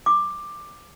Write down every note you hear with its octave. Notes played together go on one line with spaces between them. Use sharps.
D6